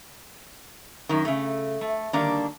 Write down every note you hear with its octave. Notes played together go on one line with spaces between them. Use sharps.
F#2 D#3
C#3 A3
A3
D3 D#3 G3 A#3 D4